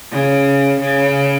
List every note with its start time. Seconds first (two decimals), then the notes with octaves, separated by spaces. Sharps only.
0.11 C#3
0.80 C#3